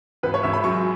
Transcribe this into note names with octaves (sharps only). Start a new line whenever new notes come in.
G#1 B4
C#5
G#1 E5
B5
F#2 C#6